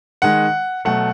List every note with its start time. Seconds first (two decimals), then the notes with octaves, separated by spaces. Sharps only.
0.22 D#3 G#3 F#5
0.85 B2 F#3 A3 F#5